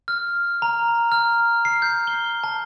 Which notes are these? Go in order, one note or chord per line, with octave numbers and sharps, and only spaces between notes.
F6
A#5
F6
C7
G6
G7
A5